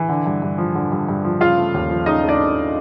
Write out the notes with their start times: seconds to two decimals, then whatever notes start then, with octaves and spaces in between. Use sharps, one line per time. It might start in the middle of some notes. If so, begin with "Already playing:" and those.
Already playing: E3
0.09 D3
0.26 G2
0.42 G2
0.58 F3
0.75 D3
0.92 G2
1.09 G2
1.24 F3
1.41 C#3 F4 F5
1.58 A3
1.74 D#2
1.90 F3
2.06 C#3 D#4 D#5
2.23 A3
2.28 D4 D5